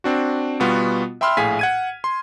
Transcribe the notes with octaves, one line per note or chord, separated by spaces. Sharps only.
C4 D4 F#4
B2 G3 B3 F4 F#4
E5 G5 B5 C6 E6 F6
A#1 A2 G#4 F5 G#5 B6
F#5 G#6 D#7
C6